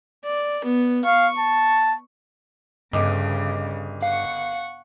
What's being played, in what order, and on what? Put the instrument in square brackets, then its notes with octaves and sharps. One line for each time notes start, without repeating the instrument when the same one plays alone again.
[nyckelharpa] D5
B3
[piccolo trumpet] F5 [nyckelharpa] C#6
[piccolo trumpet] A5
[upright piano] G1 D#5 D6 [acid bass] G2 [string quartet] C#3
[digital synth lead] F5 [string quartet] F#5 C#6